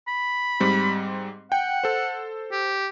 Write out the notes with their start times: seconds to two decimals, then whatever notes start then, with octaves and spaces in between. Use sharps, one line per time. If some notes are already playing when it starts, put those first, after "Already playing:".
0.08 B5
0.60 G#2 G3 C4
1.52 F#5 G5
1.84 A4 C5
2.52 G4